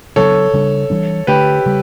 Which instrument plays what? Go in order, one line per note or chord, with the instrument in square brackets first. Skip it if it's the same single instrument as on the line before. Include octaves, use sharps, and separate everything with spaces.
[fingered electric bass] C#3 F#3 B3 D4 [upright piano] A4 C#5
[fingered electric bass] C#3 G3 D4
E3 G3 D4
[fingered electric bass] D3 A3 D4 [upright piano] G4 B4
[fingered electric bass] C#3 G3